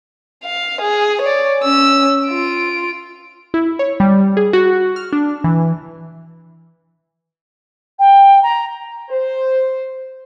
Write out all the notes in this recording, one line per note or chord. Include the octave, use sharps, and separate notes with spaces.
F5
G#4
C#5 D5
C#4 E6
F4 D7
E4
C#5
G3
G#4
F#4
F6
D4
E3
G5
A#5
C5